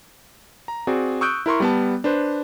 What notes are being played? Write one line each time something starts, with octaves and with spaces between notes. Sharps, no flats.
A#5
C4 F#4 G#4 D5
C#6 D#6 E6 F#6 G6 D7
E4 A#4 C6 C#6
G3 B3 A5
D4 B4 C5